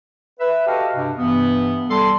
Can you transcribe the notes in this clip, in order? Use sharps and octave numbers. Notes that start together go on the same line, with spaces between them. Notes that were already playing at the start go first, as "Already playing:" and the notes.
B4 E5
F#4 G4 A4 D#5 F5
G2 C3
G2 C3 E3 B3
G3 A4 C6